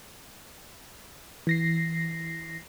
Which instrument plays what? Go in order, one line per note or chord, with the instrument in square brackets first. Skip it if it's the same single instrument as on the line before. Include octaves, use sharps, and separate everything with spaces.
[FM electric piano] E3 A#6 C7